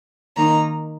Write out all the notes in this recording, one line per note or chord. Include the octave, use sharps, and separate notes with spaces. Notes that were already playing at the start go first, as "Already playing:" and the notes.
D#3 A#3 D#4 A#5